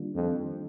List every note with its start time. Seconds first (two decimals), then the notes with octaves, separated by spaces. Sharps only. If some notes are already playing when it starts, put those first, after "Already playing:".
Already playing: D#3 G3 A#3 D4 F4
0.15 F2